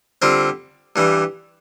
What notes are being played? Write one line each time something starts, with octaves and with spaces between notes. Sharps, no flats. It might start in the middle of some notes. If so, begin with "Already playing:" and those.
D3 G3 C4 F4
G2 E3 G3